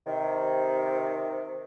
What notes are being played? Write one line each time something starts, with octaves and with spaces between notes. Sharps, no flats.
C3 D#3